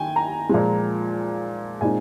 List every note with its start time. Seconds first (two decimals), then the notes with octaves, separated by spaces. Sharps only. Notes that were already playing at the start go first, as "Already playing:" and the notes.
Already playing: D#3 G5 G#5
0.16 A#5
0.49 A#2 F3 G#3
1.81 A#2 G#3 C4 D#4 G#5